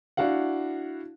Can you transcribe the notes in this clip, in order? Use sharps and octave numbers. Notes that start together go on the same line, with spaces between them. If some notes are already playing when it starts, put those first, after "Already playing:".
D4 E4 F#4 F5 F#5